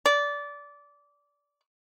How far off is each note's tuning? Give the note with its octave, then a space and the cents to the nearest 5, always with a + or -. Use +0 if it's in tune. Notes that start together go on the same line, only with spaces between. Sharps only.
D5 -20